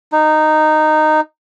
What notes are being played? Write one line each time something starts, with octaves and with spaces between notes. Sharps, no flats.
D#4